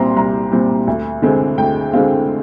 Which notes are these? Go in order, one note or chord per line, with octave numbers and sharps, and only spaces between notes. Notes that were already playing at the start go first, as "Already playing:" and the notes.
Already playing: C2 A#2 G3 C4 A#5 C6
C2 A#5
A#2 G3 C4
D2
D3 G#3 C4
D2 G5
D3 G#3 C4 F5